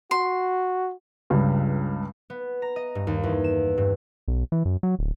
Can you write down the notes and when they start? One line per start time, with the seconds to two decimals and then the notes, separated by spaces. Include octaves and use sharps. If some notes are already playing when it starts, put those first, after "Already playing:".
0.11 F#4 C6
1.30 C#2 G2 C#3
2.30 B3
2.62 A#5
2.76 D#5
2.95 G2
3.07 D#2
3.24 E2
3.44 E7
3.78 G2
4.28 B1
4.52 E3
4.65 F#2
4.83 F#3
4.99 D1